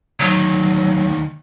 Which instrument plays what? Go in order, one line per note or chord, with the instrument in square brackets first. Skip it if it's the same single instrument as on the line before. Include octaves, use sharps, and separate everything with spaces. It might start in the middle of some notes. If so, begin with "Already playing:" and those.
[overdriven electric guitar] D2 D#3 [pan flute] F#3